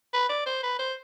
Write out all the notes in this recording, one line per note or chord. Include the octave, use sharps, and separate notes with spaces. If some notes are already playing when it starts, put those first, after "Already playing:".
B4
D5
C5
B4
C5